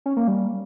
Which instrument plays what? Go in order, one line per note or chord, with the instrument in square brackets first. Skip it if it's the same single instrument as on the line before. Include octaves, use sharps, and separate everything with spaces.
[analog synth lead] C#4
A#3
G3